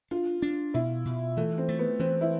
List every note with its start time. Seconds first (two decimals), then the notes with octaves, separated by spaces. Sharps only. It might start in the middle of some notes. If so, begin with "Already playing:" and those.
0.11 D4 F4
0.42 D4
0.74 B2 E4
1.05 B2
1.37 E3 A3
1.58 C4
1.69 A3
1.79 B3
1.99 E3 C4
2.21 E4